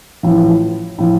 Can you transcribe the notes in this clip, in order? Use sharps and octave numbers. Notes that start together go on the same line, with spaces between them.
A1 A2 F3
A2 F3